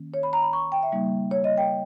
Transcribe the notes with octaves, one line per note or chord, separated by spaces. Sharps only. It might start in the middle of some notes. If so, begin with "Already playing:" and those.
Already playing: D#3 A#3 C#4
C#5
B5
A#5
B5
C#6
G5
E5
C#3 G3 A#3 D#4
C#5
D#5
G5